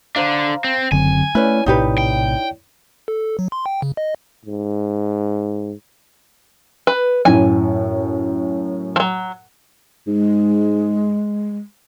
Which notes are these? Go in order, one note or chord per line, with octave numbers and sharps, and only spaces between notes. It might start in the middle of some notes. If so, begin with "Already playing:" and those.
D3 D4 C5 F5 A#5
C4
F#1 D3 F#3 C4 G#5
A3 C#4 E4 B4 C#5 D5
A#1 A2 C3 D#4 G4 B4
G5
A4
A4
F#3
C6
G5
C#3
D#5
G#2
B4
F#2 A2 G#5
F3 F#3
G#2 G#3